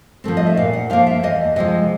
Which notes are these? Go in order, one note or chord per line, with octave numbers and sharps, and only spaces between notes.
F3 A3 C4
D#5
E5
A#2 F5
F#5
F3 A#3 F5
E5
E2 D#5
C3 F3 G#3 D#5